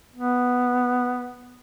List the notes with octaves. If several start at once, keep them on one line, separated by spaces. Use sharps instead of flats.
B3